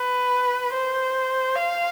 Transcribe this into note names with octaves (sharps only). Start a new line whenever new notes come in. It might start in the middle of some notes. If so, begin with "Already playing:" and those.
Already playing: B4
C5
F5